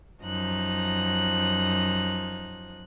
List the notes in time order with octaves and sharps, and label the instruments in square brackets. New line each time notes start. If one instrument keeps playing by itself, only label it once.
[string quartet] F#2 F3 D#4 F#6